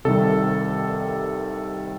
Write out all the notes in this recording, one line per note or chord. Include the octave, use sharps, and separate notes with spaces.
C2 C3 D#3 G3 A4